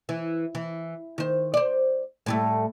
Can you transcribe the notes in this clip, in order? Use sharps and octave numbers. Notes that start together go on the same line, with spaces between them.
E3
E3
D#3 C5
C5 D5
A2 G3 A3